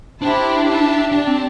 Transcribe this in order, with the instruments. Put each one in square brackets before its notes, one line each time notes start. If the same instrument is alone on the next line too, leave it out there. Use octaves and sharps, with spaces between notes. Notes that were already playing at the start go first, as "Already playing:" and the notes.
[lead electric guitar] D4 [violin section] E4 G4 C5 A5
[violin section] G4 E5 A5
[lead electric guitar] D4 [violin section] G4 D5 A5
[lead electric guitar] C4